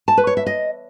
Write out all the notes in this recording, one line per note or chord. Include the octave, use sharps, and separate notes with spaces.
A5
B4
C#5
E5
D#5